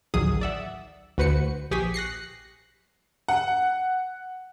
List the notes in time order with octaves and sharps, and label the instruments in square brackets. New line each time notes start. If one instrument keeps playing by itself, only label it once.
[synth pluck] A1 D2 D#3 F#3 G#4 D#6
D5 E5 F#5
D2 F#4 B4 C5 C#7
A#1 G4 G#4 C#6 B6
F#6 A#6 C7 C#7
[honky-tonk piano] F#5